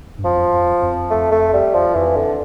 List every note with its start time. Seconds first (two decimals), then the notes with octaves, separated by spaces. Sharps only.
0.18 G2
0.25 F2 F3
0.53 F2
0.82 F2
1.10 A3
1.32 A3
1.53 G3
1.74 F3
1.95 F2 E3
2.16 D3